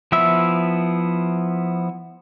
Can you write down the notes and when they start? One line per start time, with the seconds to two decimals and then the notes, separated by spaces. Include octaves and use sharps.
0.12 F3 B3 E4 E5 E6